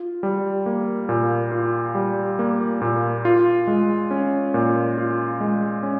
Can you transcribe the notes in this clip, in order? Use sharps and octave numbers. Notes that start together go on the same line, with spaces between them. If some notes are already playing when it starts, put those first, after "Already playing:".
Already playing: F4
G3
A#3
A#2
F4
G3
A#3
A#2
F4
G#3
C#4
A#2
F4
G#3
C#4